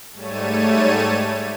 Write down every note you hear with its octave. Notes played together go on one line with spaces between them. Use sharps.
G#2 G3 A3 C#5 A5 D#7